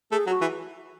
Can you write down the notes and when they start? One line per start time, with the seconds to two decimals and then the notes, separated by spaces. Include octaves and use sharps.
0.12 A3 G#4
0.27 F#3
0.30 F#4
0.41 E3